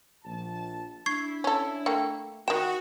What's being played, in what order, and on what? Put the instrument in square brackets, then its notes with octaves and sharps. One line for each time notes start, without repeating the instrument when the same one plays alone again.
[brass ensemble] A#1 A5
[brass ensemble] D4 E4 [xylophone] C#6 G#6 C7
[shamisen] C#4 A4
[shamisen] A3 A#3 [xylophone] G5
[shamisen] D#3 G5 [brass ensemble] F#4 [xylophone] E7